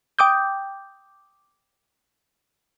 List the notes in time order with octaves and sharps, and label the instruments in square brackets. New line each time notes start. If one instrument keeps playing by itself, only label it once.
[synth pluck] G5 D6 D#6 G6